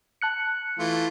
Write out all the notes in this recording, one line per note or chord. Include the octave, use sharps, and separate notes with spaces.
A5 F#6 C#7
E3 A3 F4